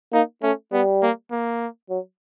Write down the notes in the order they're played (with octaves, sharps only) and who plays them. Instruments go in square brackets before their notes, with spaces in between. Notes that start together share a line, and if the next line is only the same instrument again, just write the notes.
[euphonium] A#3 [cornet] D#4
[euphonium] A3 [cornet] C#4
[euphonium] G3 [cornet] B3
[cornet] A#3
A#3
[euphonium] F#3